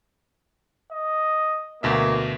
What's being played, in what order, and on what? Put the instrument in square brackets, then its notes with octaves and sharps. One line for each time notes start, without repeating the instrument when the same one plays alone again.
[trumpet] D#5
[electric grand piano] D2 B2 E5 [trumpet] A#3